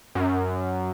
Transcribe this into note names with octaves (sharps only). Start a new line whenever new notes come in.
F#2